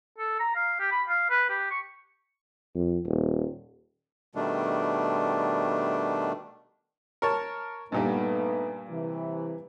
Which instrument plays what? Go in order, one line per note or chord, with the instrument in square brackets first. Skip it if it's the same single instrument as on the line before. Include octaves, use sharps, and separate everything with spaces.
[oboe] A4
A#5
F5
G4
B5
F5
B4
G4
C#6
[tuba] F2
D#1
[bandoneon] B2 D#3 G3 A3 D4
[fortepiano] A#4 C#5 A5
[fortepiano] G2 A#2 G3 [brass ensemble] A3 B3 D#4
[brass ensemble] C3 E3